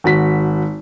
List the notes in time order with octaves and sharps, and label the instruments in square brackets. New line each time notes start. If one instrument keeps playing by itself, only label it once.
[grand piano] G#1 F#4 B6